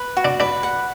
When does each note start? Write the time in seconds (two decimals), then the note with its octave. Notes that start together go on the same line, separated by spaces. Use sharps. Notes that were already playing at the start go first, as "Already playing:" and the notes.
Already playing: B4 B5
0.17 F#4
0.25 D4
0.40 D4 B4
0.63 F#5